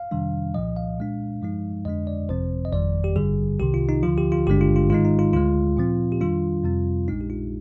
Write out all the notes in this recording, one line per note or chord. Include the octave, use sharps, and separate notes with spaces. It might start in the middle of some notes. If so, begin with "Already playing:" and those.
Already playing: F5
F2 C3 D#3 G3 D4
C2 A#2 F3 D#5
F5
A#2 G#3 D4
G2 F3 G#3 D#4
F2 D3 G#3 D4 D#5
D5
G1 F2 C3 F3 C4 C5
D#5
G1 F2 D#3 G3 D5
G4
G#1 G2 D3 G3 G#4
C2 C3 D#3 G4
F4
D#4
D2 D3 F3 F4
G4
F4
G#1 G2 D3 G#3 D4 G4
F4
F4
G#2 D#3 G#3 D#4 F4
D#4
F4
D2 D3 G#3 F4
A#2 F3 C4
G4
F2 D#3 G3 D4 F4
F2 C3 G3 C4
A#1 A#2 G#3 D4 D#4
G4
F4